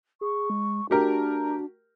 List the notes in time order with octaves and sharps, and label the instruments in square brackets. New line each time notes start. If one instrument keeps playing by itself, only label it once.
[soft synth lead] G#4 [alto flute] C#6
[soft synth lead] G#3
[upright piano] A3 G4 A#4 [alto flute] D4 [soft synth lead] F#4